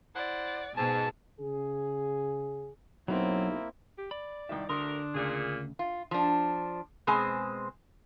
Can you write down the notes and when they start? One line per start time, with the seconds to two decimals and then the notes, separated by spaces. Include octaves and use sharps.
0.16 E4 C5 D5 F#5
0.77 G#2 B2 G#5 A5
1.40 C#3 G#4
3.08 B1 F#3 A#3 C4 E4
3.98 G4
4.11 D5 B5
4.49 C2 D#3 E5 G5
4.69 D2 D3 A3 D4 A#4 C6 D#6
5.15 D2 A#2 C#3 G#4
5.79 F4
6.11 F3 D4
7.07 B2 G#3 C4 G#4 C5 G#5